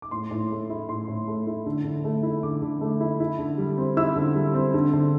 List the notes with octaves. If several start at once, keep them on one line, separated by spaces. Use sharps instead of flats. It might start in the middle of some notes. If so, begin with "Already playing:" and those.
D6
A2 C6
A2
A3
E4
A2 C6
A2
A3
E4
D3
D3
A3
E4
D3 D6
D3
A3
E4
E4
D3
G3
C4
E4 E6
D3
G3
C4
D3
D3